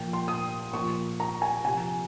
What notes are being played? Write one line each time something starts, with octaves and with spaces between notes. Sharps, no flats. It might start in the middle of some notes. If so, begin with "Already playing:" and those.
Already playing: A#2 F3 G5
C6
D#6
A#2 F3 C#6
A#5
G#5
C3 F3 G#5